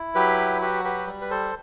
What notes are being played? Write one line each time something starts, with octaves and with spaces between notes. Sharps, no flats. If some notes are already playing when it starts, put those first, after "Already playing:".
Already playing: E4
F#3 G4 B4
F#4 G4 B4
G4 B4
G3
B4
A4 C5